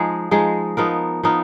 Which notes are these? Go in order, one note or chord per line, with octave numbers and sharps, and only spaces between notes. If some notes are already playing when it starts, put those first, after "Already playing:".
Already playing: F3 G#3 D#4 G#4
F3 G#3 D#4 G#4
F3 B3 D#4 A#4
F3 B3 D#4 A#4